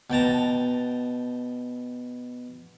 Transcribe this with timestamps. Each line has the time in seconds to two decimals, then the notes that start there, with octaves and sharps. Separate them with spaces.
0.10 B2 G5 A5 A#5